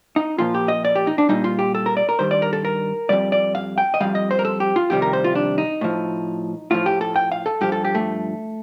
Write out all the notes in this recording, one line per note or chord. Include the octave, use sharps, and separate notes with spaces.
D#4
A#2 F3 F4
G4
D#5
D5
G4
D#4
D4
A#2 G3 D#4
F4
G4
A4
A#4
D5
A#4
G2 D#3 G3 C5
D5
A#4
A4
A#4
F2 C3 G3 D5
D5
F5
G5
D#5
F2 D#3 G3 F5
D#5
C5
A#4
A4
G4
F4
F2 C3 D#3 G3 G4
A#4
C5
F4
D4
D#4
A2 F3
A2 F3 F4
G4
A4
G5
F5
A4
G2 F3 G4
A4
G4
A3